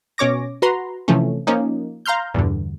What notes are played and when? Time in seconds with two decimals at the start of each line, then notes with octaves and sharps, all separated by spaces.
0.18 B2 C#4 C#5 D6 A#6
0.62 F#4 B4 A#5 C6
1.08 C3 E3 F3 A3 C#4
1.47 F3 A#3 C#4 D#4
2.06 F5 A#5 C6 F6 G6
2.34 E2 G2 B2 D3